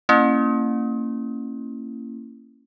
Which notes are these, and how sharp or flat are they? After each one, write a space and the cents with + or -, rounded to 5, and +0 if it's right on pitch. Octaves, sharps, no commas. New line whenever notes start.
A#3 -30 C#4 -30 E4 +0